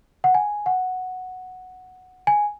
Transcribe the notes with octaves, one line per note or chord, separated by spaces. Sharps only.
F#5
G#5
F#5
G#5